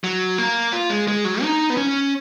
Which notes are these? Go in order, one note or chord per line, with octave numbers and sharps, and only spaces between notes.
F#3
A#3
F4
G#3
G#3
F#3
D#4
B3
C#4